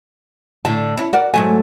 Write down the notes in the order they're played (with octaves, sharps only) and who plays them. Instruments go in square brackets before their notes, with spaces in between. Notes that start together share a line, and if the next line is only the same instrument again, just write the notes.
[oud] A2 D3 [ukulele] A5
[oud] C#4 E4
[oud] F#4 D5 [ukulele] A#4 F#5
[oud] G#2 F#3 A3 [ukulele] G#5